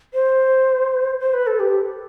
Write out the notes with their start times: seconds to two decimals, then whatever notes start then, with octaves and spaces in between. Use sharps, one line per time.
0.14 C5
1.19 C5
1.34 B4
1.47 A4
1.59 G4